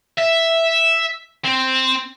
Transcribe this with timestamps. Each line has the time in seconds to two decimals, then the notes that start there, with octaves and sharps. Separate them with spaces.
0.18 E5
1.45 C4